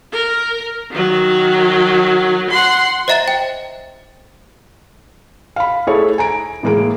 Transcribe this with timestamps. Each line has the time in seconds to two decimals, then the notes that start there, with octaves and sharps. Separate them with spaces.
0.12 A#4
0.90 D#3 F#3
2.50 F#5 C6
3.08 C5 D#5 E5 A#5 A6
3.28 G5
5.56 F5 B5
5.87 A3 E4 G#4 A4 C#5
6.18 G#5 A#5 D7
6.63 A2 E3 G#3 A#3 D7